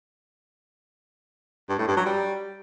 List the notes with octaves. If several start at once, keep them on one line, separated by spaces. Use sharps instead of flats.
G2
A2
G2
F#3
G3